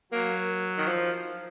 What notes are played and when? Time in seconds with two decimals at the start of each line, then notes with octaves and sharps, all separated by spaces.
0.12 F#3 A#3
0.78 D#3
0.88 F3